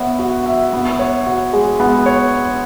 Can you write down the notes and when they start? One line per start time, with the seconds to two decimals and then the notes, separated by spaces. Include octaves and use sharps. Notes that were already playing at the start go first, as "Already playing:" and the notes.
Already playing: B3 C#5 E5
0.19 F#4
0.46 E5
0.73 B3
0.99 C#5
1.26 F#4
1.53 G#3
1.80 B3
2.06 C#5